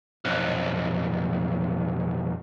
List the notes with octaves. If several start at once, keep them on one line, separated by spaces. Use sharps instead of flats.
B1 F2